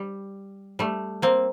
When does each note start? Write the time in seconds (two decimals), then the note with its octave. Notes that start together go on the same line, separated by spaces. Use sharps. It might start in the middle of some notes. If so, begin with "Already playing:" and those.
Already playing: G3
0.79 G3 A3
1.22 A#3 C4